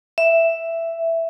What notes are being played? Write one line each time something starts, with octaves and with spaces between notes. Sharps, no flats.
E5